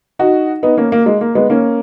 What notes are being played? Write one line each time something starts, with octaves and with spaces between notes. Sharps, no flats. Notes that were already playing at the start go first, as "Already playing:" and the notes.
D#4 F#4
B3 D#4
A#3 C#4
A#3
G#3
A#3
G#3 B3
A#3 C#4